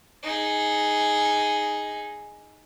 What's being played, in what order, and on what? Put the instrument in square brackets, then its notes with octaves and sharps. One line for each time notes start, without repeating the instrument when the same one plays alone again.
[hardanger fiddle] D#4 G#4